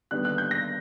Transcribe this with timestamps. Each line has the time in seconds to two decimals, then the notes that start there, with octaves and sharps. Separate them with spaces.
0.11 D#2 D3 G3 B3 F#6
0.25 F#6
0.38 G6
0.51 A#6